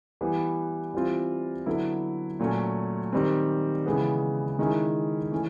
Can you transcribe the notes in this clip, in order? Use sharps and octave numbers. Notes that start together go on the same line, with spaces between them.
E3 G3 B3
E3 G3 C4 F4
D3 F#3 B3 E4
A#2 F#3 A3 C#4
D#3 G3 C4
C#3 E3 G#3 B3
D#3 G#3 C#4 E4
E3 A3 C#4